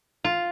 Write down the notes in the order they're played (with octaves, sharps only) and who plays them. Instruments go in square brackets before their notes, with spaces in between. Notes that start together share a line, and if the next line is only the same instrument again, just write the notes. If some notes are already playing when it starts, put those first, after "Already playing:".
[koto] F4